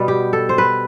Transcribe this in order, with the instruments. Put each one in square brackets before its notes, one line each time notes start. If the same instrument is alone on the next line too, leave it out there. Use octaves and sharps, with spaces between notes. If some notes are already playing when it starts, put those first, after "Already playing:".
Already playing: [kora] B2 G3 B3
G4
A4
C5
B4